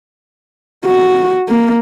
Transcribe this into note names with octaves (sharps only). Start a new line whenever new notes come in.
F#4
A#3